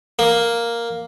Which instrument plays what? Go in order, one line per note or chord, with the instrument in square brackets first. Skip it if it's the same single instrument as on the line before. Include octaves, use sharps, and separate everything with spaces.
[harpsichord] A#3